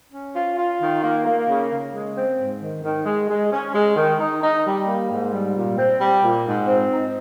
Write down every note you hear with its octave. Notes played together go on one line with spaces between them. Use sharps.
C#4
F4
F4
D#3
A#3
A#3
C#3
C#3
G#3
C4
G#2
D#3
D#3
G#3
G#3
C#4
G#3
D#3
D#4
D#4
G3
A#3
G#2
G3
A#2
C4
G3
A#2
G#2
C4
D#4